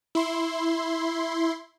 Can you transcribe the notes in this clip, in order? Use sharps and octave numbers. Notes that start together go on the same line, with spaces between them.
E4 C6